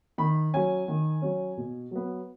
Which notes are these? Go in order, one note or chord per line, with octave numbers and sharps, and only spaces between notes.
D#3 B5
F#3 C#4 G#5
D#3
F#3 C#4
B2
F#3 B3